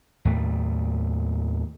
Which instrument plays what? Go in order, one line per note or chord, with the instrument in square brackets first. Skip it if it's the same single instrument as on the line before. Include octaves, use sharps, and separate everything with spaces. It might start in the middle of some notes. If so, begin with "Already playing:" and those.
[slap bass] D#2 A2 A3